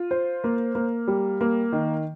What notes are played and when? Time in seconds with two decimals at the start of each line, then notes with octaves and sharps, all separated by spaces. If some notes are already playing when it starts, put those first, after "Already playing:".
Already playing: F4
0.11 C5
0.44 A#3
0.75 A#3
1.07 G3
1.41 A#3
1.72 D#3